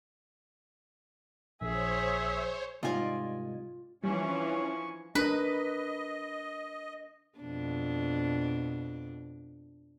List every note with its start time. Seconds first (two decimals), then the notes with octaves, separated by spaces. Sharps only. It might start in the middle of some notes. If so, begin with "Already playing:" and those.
1.61 A#1 G#4 C5 C#5 E5
2.83 C2 G#2 F4 D5 D#5 G#5
4.04 E3 F3 G3 C#4 D4 G#5 C#6
5.15 D4 A#4 B4 D#5
7.38 F2 B2 D4